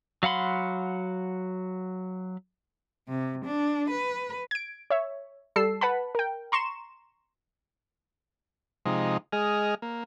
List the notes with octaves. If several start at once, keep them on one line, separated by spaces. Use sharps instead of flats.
F#3 F5 F#5 B5 C6
C3
D4
B4
G#6 D7
C#5 E5
G3 A4 E6 C7
B4 F#5 A5 B5
A#4 G5
A#5 C6 C#6 E7
C3 F3 G#3 D#4
G#3 G#4 D#5 F6
A#3